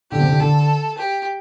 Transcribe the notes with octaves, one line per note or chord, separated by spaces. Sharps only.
D3 G4
C3
D3
D3 A4
G4